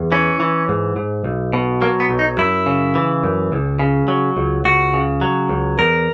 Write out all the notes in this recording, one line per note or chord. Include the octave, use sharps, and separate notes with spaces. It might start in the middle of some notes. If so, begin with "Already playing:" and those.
Already playing: E2
E3 C#4
E3
G#2
G#2
B1
B2
F#3 A#3
B3
B1
D#4
F#2 E4
C#3
E3
F#2
C#2
C#3
F#3
C#2
C#2 F#4
C#3
F#3
C#2
E2 A#4